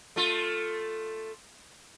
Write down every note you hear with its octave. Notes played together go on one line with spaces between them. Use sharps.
A3 F4